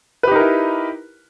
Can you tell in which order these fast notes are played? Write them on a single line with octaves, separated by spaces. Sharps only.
B4 G4 D#4 A#4 E4